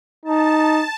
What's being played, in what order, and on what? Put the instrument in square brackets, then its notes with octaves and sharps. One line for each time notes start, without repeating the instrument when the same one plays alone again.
[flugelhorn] D#4 [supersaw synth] A5
[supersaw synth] A5